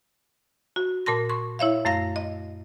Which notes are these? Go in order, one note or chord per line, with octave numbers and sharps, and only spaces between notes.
F#4
A#2 A#4 A5 C6 A#6
C6 C#6
E4 C#5 E5 F5
F#2 A3 F5 A#6
D#5